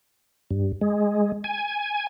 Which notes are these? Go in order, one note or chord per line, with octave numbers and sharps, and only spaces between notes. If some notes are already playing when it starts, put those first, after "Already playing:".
G2
G#3
G#5